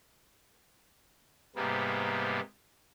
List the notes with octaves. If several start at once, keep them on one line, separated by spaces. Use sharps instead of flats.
G#2 C3 G3 A#3 B3